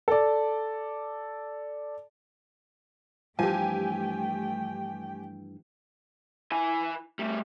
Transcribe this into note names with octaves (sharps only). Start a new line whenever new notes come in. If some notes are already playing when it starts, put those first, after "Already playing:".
A4 D5
G2 E3 F3 A3 G4 G5 G#5
E4 G#5
G3 A3